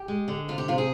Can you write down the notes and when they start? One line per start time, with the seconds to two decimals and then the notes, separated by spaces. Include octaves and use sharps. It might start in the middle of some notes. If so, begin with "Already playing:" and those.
Already playing: G4
0.08 G#3
0.28 D3
0.48 C3 F4
0.58 G4
0.68 C3 F4
0.78 G#4